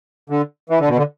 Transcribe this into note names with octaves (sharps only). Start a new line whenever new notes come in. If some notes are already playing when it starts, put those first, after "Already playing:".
D3
E3
D3
B2
D3